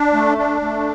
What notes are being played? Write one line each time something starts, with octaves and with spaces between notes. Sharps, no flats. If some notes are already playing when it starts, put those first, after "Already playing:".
Already playing: D4
A3
D4
A3